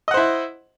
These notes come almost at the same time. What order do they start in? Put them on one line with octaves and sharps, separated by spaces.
D#5 F#5 C5 E4